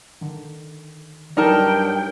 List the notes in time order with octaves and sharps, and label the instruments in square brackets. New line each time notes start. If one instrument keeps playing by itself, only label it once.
[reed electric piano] D3 D#3
[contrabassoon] G2 [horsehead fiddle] F#3 G5 [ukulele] D#4 A#4 A5 [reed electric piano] D5